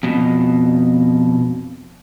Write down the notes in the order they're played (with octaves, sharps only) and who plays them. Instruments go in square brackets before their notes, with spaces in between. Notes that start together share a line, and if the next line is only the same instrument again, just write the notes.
[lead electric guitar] F2 B2